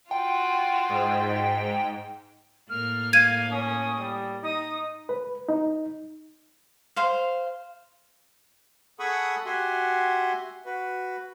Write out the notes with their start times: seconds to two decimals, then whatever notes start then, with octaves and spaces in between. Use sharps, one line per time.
0.11 F4 F#4 G5
0.89 G#2
2.69 A2 A#3 F6
3.13 F5 G#6 D#7
3.51 C#4 D#6
3.99 G3
4.43 D#4 D#6
5.09 B4
5.49 D#4
6.96 C5 F5
8.99 G#4 A4 F#5 B5 C#6 D#6
9.46 F#4 G4 E5 F#5 G#5 C6
10.66 F#4 B4